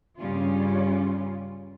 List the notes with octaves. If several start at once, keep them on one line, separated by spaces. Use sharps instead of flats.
G2 C#3 G3 C#4 F4